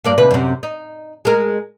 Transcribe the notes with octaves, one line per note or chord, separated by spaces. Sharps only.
G2 A#3 D5
D#2 C3 B4
F#2 C3
D#4
G#3 A#4